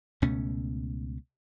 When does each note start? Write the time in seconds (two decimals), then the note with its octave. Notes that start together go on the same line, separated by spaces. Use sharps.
0.22 C#2 B2 A3 C#4